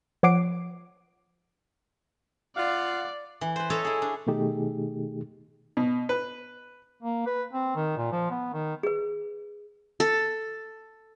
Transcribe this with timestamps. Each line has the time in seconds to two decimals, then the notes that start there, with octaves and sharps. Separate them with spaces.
0.23 F3 C#5 F#5 D6 C7 D7
2.57 F4 D5 F5 F#5
3.41 E3
3.56 B4 C5
3.70 A4 C#5 D#5 A5 A#5
3.85 E4 G#4
4.02 D4
4.27 B2 D#3 A3 D#4 G4 G#4
5.77 B2
6.09 B4
7.03 A#3
7.26 B4
7.53 C4
7.76 D#3
7.97 A#2
8.12 F3
8.30 B3
8.53 D#3
8.83 G#4 B4
10.00 A4